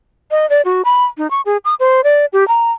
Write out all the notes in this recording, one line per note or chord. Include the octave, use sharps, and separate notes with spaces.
D#5
D5
F#4
B5
D#4
C#6
G#4
D#6
C5
D5
G4
A#5